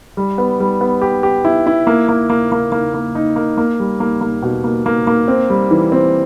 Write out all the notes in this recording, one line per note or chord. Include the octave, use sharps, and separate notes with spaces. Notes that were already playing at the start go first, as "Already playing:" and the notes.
G3
B3
G3
B3
G4
G4
E4
E4
A#3
A#3
A#3
A#3
A#3
A#3
D#4
A#3
A#3
G3
A#3
A#3
B2
A#3
A#3
A#3
C4
G3
E3
C4